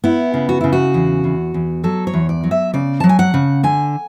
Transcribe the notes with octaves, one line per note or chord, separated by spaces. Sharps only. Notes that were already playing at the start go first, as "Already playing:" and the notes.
B3 E4
C#3
F#4
C#3 E4
F#4
E2
E2
E2
F#3 A4
C#5
E2
D5
F#3
E5
C#3 D5
F#3 A5
G#5
F#5
C#3
D3 G#5